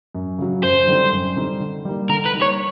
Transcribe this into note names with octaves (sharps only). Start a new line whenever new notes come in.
F#2
C#3 F#3
F#2 C5
D3 G3 C4 D#4
F#2
D3 G3 C4 D#4
D3
G3 A#3 D#4
D3 A#4
B4
G3 A#3 D#4
C#5